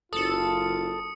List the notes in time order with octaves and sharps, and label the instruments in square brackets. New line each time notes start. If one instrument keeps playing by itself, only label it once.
[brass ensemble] F#1 F4 [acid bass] A4 [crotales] D#6 C#7